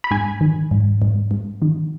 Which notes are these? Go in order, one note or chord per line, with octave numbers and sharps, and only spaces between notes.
B5
G#2 G#5
D#3
G#2
G#2
G#2
D#3